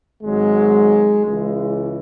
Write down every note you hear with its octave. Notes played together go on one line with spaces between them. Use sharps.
G#1 G#2 F#3 G#3
C#2 C#3 E3 G#3